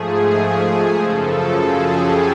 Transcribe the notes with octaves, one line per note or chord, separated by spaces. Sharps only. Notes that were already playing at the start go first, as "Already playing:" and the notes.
Already playing: G#2 F3 A3 G#4
F#2 C#3 F3 A4
G#4
G4